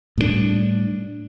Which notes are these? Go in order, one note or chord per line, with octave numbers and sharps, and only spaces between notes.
A2 G3 G#3 D4